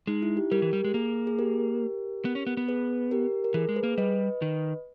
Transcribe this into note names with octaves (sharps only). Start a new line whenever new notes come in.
G#3 D#4
E4
G4
G3 G4 A#4
E3
G3
G#3
A#3 G#4
G#4
G4 A#4
B3
C#4
B3
B3
G#4 B4
G4 A#4
A#4
E3 G#4
G#3
G#4 B4
A#3
G3 B4 D#5
D#3